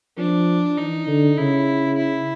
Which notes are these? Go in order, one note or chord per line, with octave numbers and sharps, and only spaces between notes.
F3 D4
E3 D#4
D3
C#3 E4
E4